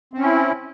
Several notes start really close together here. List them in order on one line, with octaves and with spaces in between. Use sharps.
C4 C#4 E4